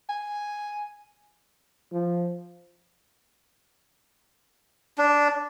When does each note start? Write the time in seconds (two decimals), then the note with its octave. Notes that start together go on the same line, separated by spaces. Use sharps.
0.09 G#5
1.92 F3
4.98 D4